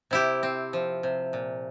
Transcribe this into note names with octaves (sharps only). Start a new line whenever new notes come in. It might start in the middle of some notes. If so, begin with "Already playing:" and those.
C3 E4 G4
C4
F3
C3
A#2